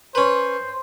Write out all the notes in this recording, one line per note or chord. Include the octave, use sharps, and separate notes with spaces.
C#4 B4 C5